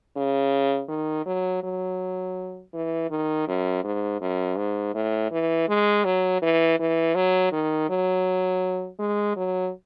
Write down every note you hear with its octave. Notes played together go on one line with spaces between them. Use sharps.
C#3
D#3
F#3
F#3
E3
D#3
F#2
G#2
F#2
G#2
A2
E3
G#3
F#3
E3
E3
F#3
D#3
F#3
G#3
F#3